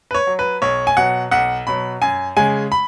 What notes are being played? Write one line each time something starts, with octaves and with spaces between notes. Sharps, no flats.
B4
C#5
F#3
B4
B1 C#5
G#5
B2 F#3 F#5
B1 F#5
B2 F#3 B5
F#2 G#5
C#3 G#3 G#5
B5